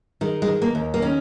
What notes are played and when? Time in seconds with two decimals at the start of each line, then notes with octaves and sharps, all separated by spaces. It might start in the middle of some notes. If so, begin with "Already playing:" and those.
0.21 D#3 G#3
0.42 G#3
0.48 D#3
0.62 A#3
0.75 D#2
0.94 A#3
1.02 D#3 C#4